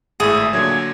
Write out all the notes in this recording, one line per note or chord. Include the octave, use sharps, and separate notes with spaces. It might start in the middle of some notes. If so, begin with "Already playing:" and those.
G#1 A2 G#4 E5
A#2 D3 F#3 G#6